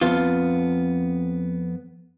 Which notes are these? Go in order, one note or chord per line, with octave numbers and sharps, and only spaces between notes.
F2 B3 F4